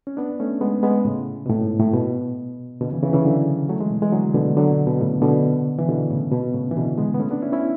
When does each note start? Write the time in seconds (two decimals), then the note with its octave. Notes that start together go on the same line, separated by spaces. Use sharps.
0.07 C#4
0.17 B3 D4
0.40 A3 C#4
0.61 G#3 B3
0.83 G#3 B3
1.05 A2 C#3
1.46 B2
1.49 A2
1.64 G#2
1.79 A2
1.94 B2
2.81 B2 D3
2.91 C#3 E3
3.03 C#3 E3
3.13 C#3 E3
3.24 D3 F#3
3.69 F#3 A3
3.80 E3 G#3
3.90 B2
4.02 E3 G#3
4.12 D3 F#3
4.34 B2 D3
4.57 D3 F#3
4.71 B2
4.87 B2
5.01 A2 C#3
5.22 B2 D3
5.79 E3
5.88 B2 D3
6.10 A2 C#3
6.32 B2
6.54 A2 C#3
6.71 E3
6.76 B2 D3
6.98 G#3 B3
7.14 B3
7.20 A3 C#4
7.31 B3 D4
7.42 C#4 E4
7.53 C#4 E4